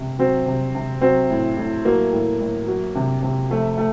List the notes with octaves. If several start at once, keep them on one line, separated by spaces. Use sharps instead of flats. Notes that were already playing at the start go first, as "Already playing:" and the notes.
Already playing: C3
F#3 C4
C3
C3
F#3 C4
A2
A2
F#3 A#3
A2
A2
F#3
C3
C3
F3 A3
A3